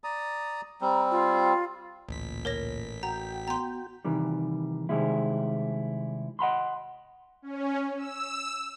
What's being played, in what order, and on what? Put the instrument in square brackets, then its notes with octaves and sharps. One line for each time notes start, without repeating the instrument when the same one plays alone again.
[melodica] D5 A#5 D#6
[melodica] G3 C4 [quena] A#5
[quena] F4
[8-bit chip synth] A1 B6 [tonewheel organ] D2 [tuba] A#2
[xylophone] A#4 C#5 A#6
[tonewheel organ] F#4 G5 [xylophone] A#5
[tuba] B3 [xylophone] A#5 C6
[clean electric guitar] C3 D#3 E3 G3
C3 D#3 G3 G#3 E4
D#5 F#5 B5 C6
[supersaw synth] C#4
E6